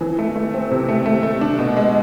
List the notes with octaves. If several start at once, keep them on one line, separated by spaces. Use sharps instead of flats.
E3
A3
A3
C4
C3
A3
A3
A3
D4
B2
G#3